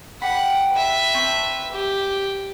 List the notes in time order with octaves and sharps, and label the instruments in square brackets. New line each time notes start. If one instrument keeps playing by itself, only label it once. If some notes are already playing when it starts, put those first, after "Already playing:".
[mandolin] G4 B5 [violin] F#5
[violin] B4 E5
[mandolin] C4 A5 C#6
[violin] G4